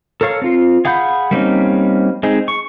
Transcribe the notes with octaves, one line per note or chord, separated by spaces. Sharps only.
A4 A#4 C#5 F5
C4 F4
G#4 F5 F#5 B5 G6
G3 A#3 C4 C#4 D#4
G#3 C4 D#4 G#4
C#6